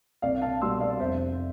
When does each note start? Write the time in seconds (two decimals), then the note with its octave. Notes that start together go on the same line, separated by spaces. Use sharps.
0.22 C2 D5 F5
0.42 F5 A5
0.62 B2 G3 B3 C6 E6
0.80 D5 F5
1.00 F1 C5 E5